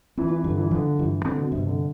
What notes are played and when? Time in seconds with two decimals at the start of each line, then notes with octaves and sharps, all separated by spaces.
0.18 E3 C4
0.31 E3
0.44 G2 D3
0.58 E3
0.71 D3 F3
0.99 G2 E3
1.25 D3 C4
1.39 B2
1.52 G2 C3
1.66 D3